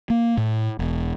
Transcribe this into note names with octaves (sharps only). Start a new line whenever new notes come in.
A#3
A2
E1